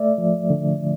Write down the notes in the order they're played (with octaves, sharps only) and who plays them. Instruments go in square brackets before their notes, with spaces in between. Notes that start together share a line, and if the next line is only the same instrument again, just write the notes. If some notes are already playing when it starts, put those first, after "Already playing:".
Already playing: [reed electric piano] A3 D5 E5
F3
D3